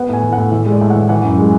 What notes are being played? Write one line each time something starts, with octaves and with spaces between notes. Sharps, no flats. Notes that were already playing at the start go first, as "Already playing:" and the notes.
Already playing: B3 F#5
A2 G#5
E3
A2 F#5
E3 E5
G#3
D5
A2
F#5
E3
E3 F#5
F#2
G#3